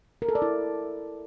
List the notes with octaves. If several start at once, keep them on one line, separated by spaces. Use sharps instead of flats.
A#4
A4
D5
E4